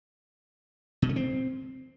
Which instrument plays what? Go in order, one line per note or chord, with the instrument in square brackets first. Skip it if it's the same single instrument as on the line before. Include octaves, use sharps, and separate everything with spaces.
[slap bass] B2
A3
C4